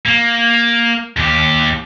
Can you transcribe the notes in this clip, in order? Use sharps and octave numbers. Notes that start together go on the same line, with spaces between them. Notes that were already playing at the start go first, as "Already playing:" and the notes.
A#3
D#2 G4